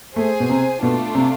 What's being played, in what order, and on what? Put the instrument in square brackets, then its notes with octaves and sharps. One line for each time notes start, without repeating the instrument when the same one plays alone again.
[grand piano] A3 [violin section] G#4 C5 G#5
[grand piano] B2
C3
[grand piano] B2 [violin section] A3 D4 F4
[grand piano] C3